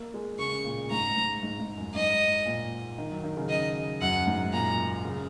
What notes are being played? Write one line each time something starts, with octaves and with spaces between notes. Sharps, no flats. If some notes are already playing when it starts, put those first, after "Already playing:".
Already playing: A#3
G#3
C#3 C#6
A#2
G#2 A#5
G#2
G#2
G#2
F#2
G#2 D#5
A#2
D#3
F#3
D#3
C#3
D#5
F#2 F#5
G#2
A#2 A#5
C#3